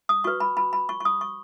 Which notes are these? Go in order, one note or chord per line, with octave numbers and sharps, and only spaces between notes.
D#6
F#4 B4 C#6
B5
B5
B5
C#6
C#6
D#6
C#6